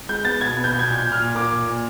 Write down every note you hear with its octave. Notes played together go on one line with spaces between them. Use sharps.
G#3 G6
B3 A6
B2 G#6
B3
G6
B2
G#6
A#2 G6
A#2
F6
A#2
A#3 D6
A#2
A#2